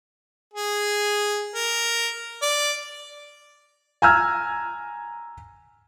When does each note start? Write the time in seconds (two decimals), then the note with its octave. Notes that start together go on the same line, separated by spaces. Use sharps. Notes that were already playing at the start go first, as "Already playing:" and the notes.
0.54 G#4
1.55 A#4
2.42 D5
4.02 G#5 A#5 E6 F6 G#6